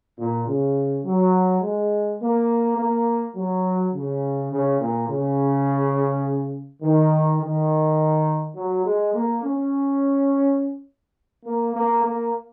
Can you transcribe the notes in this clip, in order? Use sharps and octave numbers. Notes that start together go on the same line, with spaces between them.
A#2
C#3
F#3
G#3
A#3
A#3
F#3
C#3
C#3
A#2
C#3
D#3
D#3
F#3
G#3
A#3
C#4
A#3
A#3
A#3